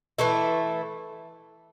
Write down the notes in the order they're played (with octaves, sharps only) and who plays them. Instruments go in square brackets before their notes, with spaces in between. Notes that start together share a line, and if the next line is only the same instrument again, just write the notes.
[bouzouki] E3 A3 E4